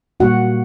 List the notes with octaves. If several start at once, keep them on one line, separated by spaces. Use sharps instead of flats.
A#2 G3 A#3 F#4 F#5